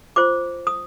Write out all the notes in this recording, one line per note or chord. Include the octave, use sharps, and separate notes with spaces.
F4 C5 D6
D#6